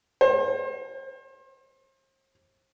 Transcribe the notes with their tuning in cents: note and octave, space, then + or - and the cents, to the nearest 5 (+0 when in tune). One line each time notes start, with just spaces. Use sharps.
C5 +40